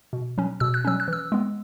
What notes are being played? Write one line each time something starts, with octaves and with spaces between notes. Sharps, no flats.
B2
F#3 C#4
B2 E6
F#6
F#3 C#4 E6
F#6
E3 E6
G#3 B3